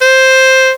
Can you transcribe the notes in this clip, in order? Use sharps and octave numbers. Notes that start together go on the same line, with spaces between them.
C5